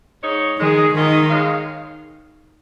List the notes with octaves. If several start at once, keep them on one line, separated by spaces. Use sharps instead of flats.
G#2 G#3 D#4 C#5
D#3 G#3 D#4 G#4
G#2 D#3 G#3 F4 G#4 D#5
G#3 D#4 C#5 F5